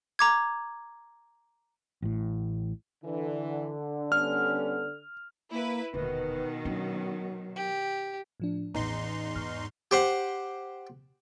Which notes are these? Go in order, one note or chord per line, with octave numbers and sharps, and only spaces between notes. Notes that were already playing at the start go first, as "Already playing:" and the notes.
A#5 D6 G#6
A1 A2
D3 E3
G3 B3 C#4 F6
A#3 E4 B4
D#1 B2 D3 D#3 B4
F#3 C#4 D4
G4
A2 F3 D4
A1 E2 D#4 A#5 C6
G#2 C#6 F6
G4 C5 F#5